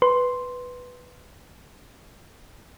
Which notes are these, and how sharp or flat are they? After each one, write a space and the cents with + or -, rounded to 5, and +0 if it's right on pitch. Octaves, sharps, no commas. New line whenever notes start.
B4 +0 C6 +0